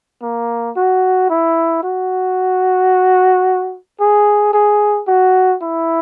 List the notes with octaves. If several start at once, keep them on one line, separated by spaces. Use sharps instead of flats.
A#3
F#4
E4
F#4
G#4
G#4
F#4
E4